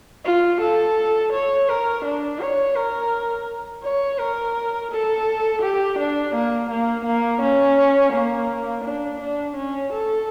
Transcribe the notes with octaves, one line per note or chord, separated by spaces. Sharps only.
F4
A4
C#5
A#4
D4
C#5
A#4
C#5
A#4
A4
G4
D4
A#3
A#3
A#3
C#4
A#3
D4
D4
C#4
A4